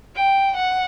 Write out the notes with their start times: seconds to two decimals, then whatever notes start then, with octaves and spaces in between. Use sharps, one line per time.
0.16 G5
0.56 F#5